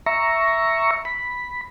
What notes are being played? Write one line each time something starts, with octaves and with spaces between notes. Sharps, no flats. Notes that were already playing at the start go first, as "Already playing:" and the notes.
E5 A#5 C#6
B5